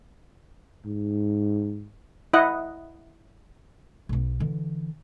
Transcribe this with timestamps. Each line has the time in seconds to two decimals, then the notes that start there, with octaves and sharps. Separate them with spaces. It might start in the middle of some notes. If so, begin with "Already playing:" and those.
0.86 G#2
2.33 E4 D#5 F#5
4.09 B1 B3
4.40 D3 E3